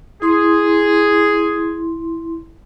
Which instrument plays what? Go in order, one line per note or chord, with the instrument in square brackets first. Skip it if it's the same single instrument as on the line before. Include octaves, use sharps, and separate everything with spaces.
[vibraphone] E4 C6 [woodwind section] G#4